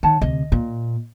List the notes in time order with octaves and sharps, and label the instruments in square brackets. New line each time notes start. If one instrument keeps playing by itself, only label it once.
[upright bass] D#3 [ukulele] C#5 F#5 A5
[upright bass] D2 C3 [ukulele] D#5
[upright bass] A#2